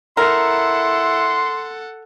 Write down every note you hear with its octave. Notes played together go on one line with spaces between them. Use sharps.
E4 A4 A#4 F#5 C6